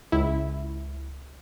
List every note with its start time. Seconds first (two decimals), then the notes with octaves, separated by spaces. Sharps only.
0.12 C#2 E4